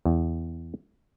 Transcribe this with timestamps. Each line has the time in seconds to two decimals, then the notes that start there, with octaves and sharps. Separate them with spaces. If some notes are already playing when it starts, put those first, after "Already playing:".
0.05 E2